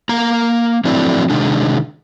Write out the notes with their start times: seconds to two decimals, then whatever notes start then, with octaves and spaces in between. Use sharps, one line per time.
0.09 A#3 A#5
0.85 F3 F#3 A3 C4 D4 E4
1.30 C3 D#3 G#3 D4